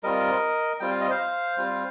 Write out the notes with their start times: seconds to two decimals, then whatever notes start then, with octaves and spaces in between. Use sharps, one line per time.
0.03 G3 C4 F4 A#4 D#5
0.80 G3 C4 F4 G5
0.91 F5
1.01 D#5
1.10 C5 F5
1.57 G3 C4 F4